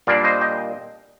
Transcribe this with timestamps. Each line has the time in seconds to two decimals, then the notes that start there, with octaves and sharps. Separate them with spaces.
0.07 A#2 G3 A#3 D4 D5 F5
0.24 C5 D#5
0.41 D#5 G5